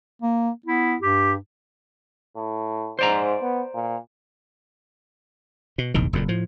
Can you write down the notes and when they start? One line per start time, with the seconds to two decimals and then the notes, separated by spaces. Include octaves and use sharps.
0.22 A#3
0.66 B3 E4
1.01 G2 G4
2.36 A2
2.99 G#2 C5 D5 A#5
3.42 B3
3.74 A#2
5.78 B2
5.94 F1 A#1 E2 D#3
6.13 F#1 F2 A#2
6.28 A2 F3